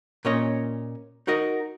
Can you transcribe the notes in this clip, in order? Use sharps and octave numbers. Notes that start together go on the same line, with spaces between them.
A#2 C#4 C#5 D#5
D#4 F#4 A#4 D#5